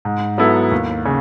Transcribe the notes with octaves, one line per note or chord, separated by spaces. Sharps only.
G#2
F#3 B3 E4 A4
D#2
C#3